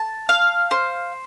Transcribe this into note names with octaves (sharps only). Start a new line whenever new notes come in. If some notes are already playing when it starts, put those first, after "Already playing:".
Already playing: A5
F5
C5